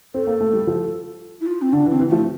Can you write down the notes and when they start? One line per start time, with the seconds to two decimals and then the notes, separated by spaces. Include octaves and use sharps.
0.14 C4 A4
0.27 A#3
0.41 A3
0.53 G3
0.67 F3
1.41 E4
1.47 F4
1.62 C4
1.73 D3 D4
1.86 E3
1.90 C4
2.00 E3
2.08 F3 A3